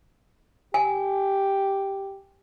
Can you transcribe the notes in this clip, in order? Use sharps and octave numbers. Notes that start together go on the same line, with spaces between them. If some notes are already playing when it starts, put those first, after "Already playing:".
G4 G#5